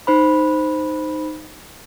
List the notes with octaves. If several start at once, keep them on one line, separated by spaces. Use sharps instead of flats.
D#4 C5 B5